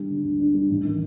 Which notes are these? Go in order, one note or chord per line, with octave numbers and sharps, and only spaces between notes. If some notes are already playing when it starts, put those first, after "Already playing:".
Already playing: G3 D4
D3
D2
D4
G3
A1
D#3